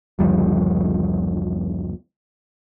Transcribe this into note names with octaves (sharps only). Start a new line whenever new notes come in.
F#1 D2 F3 G3